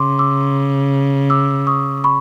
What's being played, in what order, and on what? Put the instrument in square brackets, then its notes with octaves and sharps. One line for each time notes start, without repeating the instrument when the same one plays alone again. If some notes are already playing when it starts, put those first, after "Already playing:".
Already playing: [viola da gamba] C#3 [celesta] C6 D6
[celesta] D6 E6
D6 E6
C#6 D#6
B5 C#6